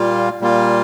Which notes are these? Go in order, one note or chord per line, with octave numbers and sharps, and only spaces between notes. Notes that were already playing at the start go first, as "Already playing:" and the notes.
Already playing: A#2 G3 A#3 F4
A#2 G3 A#3 F4